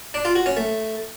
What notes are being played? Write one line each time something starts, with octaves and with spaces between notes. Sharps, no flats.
D4
F4
F#4
C#4
A3